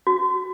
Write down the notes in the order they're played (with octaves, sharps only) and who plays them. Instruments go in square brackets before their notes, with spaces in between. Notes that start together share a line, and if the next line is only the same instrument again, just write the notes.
[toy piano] F#4